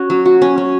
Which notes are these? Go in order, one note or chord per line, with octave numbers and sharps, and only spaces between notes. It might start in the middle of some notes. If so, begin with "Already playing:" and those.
Already playing: C#4 F#4
F#3
F#4
C#4
C#4